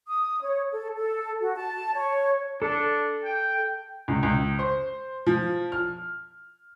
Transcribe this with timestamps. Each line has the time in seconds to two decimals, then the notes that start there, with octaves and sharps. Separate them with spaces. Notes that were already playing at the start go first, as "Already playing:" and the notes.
0.07 D#6
0.41 C#5
0.72 A4
0.97 A4
1.41 F#4
1.56 A5
1.95 C#5
2.62 D4 A4
3.25 G5
4.08 C#2
4.23 C#2
4.59 C5
5.26 F3
5.72 F6